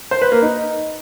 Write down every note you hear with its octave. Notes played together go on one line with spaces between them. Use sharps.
C5
B4
A#3
D#4